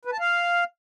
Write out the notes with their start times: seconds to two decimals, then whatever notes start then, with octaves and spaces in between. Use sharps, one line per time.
0.05 B4
0.12 A5
0.20 F5